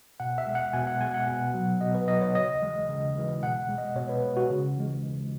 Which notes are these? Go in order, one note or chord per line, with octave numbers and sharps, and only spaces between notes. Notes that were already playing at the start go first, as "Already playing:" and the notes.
B2 F#5
E5
G#3
F#5
B2 G#5
F#5
G#3 G#5
F#5
B2
F#3
B2 D#5
B4
F#3 D#5
C#5
C#3 D#5
E3 G#3
C#3
E3 G#3
B2 F#5
G#3
D#5
B2 C#5
B4
G#3
F#4
C#3
E3 G#3